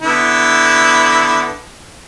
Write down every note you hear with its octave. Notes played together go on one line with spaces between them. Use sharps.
D3 B3 E4